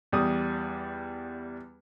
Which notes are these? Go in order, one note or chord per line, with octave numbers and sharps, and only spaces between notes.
E2 G3 D#6